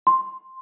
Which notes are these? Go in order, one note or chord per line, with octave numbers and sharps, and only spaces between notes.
C6